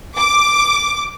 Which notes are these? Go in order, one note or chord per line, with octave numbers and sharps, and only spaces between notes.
D6